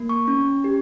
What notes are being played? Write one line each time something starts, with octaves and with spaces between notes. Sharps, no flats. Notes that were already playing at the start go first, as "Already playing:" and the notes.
Already playing: A#3
C#6
C#4
G4